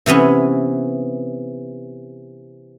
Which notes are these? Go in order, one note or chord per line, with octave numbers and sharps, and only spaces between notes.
C3 E3 B3 C#4